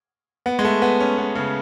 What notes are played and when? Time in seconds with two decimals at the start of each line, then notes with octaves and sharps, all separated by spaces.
0.46 B3
0.59 G#3
0.65 A3
0.82 B3
1.00 C#4
1.19 B3
1.36 C#3